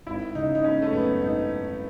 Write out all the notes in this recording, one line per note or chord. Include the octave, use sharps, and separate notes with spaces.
G#1 E4
C#3 D#4
D#4
G#3 C#4
A3
F#2 B3
G#1 D#4